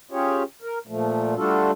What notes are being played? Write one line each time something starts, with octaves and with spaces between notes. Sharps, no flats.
C#4 F4 G4 G#4 C#5
A#4
A#2 F3 A3
G3 A3 D4 F4 F#4 A4